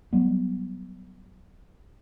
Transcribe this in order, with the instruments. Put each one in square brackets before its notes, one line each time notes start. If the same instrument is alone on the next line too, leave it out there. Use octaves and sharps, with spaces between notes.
[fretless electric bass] F#3 G3 B3